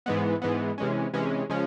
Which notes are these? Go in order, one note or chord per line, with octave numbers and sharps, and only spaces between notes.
G#2 E3 G#3 B3
G#2 E3 G#3 B3
C3 E3 G#3 C#4
C3 E3 G#3 C#4
C#3 F3 G#3 C#4